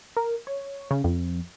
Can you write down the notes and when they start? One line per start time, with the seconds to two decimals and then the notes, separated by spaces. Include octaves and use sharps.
0.17 A#4
0.47 C#5
0.91 C#3
1.04 F2